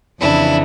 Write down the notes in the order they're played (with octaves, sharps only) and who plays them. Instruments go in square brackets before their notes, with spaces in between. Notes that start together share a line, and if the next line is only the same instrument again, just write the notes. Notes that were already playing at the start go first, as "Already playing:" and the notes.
[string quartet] F2 C#3 E3 D4 E4